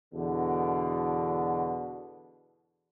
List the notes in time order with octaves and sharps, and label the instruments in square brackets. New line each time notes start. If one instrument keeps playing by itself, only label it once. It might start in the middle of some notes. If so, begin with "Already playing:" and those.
[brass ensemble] E2 B2 D3